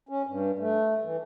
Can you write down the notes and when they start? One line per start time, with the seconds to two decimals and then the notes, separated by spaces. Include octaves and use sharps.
0.09 C#4
0.27 G2
0.59 A3
1.03 E3